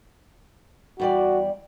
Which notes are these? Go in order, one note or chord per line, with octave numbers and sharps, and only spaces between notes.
E2 G3 F#4 D5